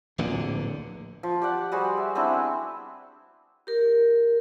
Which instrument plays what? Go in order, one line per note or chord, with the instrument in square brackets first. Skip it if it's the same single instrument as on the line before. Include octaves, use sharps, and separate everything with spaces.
[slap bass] D1 A#1 E2 D3
[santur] F3
G4 D5 F#5
G3 F#4 G#4 C5
E5
B3 C4 D4 E4
[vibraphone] G4 A#4